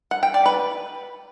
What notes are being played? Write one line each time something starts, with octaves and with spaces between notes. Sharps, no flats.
F#5
G5
D5
B4